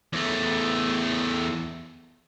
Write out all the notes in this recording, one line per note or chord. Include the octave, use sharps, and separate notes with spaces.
E2 A3